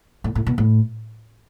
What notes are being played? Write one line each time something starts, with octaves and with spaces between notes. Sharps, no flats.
A2
A2
B2
A2